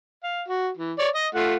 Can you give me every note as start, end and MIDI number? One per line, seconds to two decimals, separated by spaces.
0.23 0.43 77
0.48 0.69 66
0.77 0.93 52
0.99 1.08 73
0.99 1.08 74
1.15 1.27 75
1.35 1.56 57
1.35 1.56 65
1.35 1.56 78